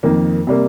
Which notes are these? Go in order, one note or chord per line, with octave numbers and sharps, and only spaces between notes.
F2 D#3 A#3
C3 G3 A#3